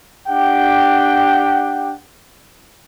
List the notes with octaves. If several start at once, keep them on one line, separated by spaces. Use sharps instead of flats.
D4 G4 F#5 G5